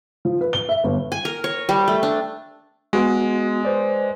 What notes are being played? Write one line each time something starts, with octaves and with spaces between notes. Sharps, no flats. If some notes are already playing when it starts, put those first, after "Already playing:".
F3
B4
G7
E5
G1
G#5
A#4
C#5
G3
A3
D4
G#3 B3 F#4
B4 C5 D5